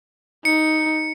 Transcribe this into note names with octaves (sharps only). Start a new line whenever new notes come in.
D#4 C#7